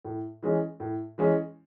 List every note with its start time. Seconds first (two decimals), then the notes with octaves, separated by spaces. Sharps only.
0.05 A2
0.42 E3 G#3 C#4
0.80 A2
1.18 E3 G#3 C#4